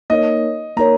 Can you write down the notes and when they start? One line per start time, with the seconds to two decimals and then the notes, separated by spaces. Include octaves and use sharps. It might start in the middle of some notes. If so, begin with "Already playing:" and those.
0.10 A#3 D#4 A#4 C#5 D#5
0.77 A#3 D#4 A#4 C#5 A#5